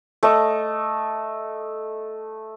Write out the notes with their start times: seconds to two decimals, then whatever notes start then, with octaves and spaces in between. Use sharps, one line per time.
0.23 A3 D#5